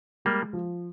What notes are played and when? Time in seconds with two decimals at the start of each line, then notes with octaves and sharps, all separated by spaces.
0.25 G3 G#3 A#3
0.53 F3